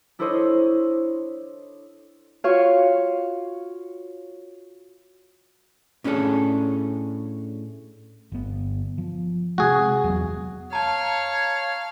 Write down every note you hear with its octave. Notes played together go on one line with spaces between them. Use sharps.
D4 E4 A4 C5 C#5 D#5
F4 F#4 C#5 F5
A2 C#4 D4 G#4 A4
G1 B3
F3
C3 G#3 F#4 G#4
E2 F#3 B3
C#5 F5 A5 A#5